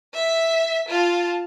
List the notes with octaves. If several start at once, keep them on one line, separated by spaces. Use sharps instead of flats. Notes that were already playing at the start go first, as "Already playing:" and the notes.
E5 B6
F4 A5